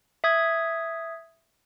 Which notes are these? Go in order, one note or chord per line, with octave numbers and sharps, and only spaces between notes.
E5 D#6 G#6